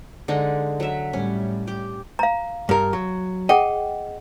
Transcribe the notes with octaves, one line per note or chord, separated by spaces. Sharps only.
D3 G#3 D#4
F#3 E5
A2 G3 C#4
G4
F5 A#5
G2 A#4
F#3
G#4 D#5 F#5 G5